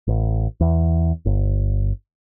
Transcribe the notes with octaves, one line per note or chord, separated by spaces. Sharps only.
A1
E2
G1